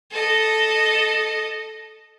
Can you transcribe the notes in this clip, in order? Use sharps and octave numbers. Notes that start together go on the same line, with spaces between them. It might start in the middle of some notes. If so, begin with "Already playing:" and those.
A4 D#5